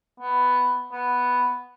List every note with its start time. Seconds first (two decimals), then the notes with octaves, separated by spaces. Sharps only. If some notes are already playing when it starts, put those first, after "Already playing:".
0.20 B3
0.92 B3